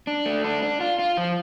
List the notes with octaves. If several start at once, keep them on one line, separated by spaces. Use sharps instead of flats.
D4
A3
D4
D4
F4
F4
F3